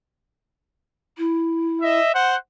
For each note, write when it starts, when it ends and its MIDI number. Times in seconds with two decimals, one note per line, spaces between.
1.17 1.98 64
1.80 2.08 75
1.80 2.08 76
2.14 2.35 72
2.14 2.35 78